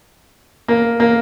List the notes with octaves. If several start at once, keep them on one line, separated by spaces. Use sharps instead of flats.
A#3
A#3